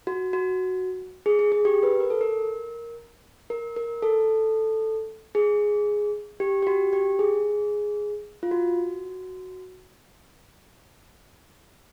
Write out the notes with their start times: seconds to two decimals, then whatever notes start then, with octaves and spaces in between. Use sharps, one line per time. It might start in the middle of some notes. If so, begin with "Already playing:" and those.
0.07 F#4
0.33 F#4
1.26 G#4
1.39 G#4
1.52 G#4
1.65 G4
1.83 B4
2.00 A#4
2.10 A4
2.21 A#4
3.50 A#4
3.76 A#4
4.03 A4
5.35 G#4
6.40 G4
6.62 G4
6.67 F#4
6.93 G4
7.19 G#4
8.43 F4
8.51 F#4